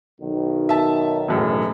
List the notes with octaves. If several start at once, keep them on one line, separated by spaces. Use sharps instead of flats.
B1 D#3
E5 A5
E1 F#2 A2